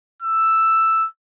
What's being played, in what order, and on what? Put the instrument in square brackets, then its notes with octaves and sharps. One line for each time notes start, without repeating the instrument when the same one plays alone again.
[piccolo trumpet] E6